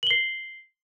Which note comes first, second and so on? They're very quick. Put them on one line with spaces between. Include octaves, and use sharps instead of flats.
F#7 G7 C7